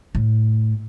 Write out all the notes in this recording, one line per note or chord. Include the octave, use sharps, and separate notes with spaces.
A2